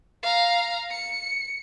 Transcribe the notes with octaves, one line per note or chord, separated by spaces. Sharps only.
F5 A#5
C#7